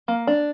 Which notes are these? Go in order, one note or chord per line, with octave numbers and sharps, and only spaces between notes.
A#3
D4